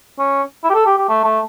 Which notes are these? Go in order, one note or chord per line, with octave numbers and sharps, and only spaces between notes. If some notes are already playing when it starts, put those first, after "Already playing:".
C#4
E4
G4
A4
G4
G4
A3
A3